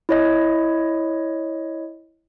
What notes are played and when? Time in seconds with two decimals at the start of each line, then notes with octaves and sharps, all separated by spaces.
0.09 E4 C#5 D#5